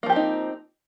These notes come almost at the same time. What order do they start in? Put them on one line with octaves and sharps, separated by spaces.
A#3 F3 G4 C4 D#4